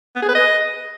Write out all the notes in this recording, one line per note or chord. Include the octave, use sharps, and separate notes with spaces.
B3
G#4
B4
D#5